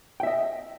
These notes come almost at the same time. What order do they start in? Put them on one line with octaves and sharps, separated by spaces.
G5 E5 D#5